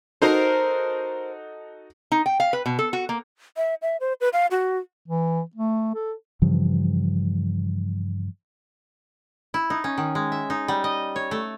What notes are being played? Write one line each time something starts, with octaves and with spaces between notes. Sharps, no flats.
D#4 F#4 A4 A#4 C5
D#4
G5
F5
B4
B2
A4
F#4
A#3
E5
E5
C5
B4
F5
F#4
E3
A3
A4
G2 C#3 E3 F3
E4
D#4
C#4
D#3
G#3
E5
D#4
G3
D#5
C#5
A3